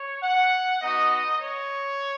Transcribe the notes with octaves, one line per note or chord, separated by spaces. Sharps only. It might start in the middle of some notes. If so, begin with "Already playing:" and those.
Already playing: C#5
F#5
B3 D#4 F#4 D#5
C#5